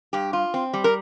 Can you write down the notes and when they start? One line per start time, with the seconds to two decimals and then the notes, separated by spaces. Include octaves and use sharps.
0.13 G2 G4
0.33 F4
0.54 C4
0.73 G3
0.84 A#4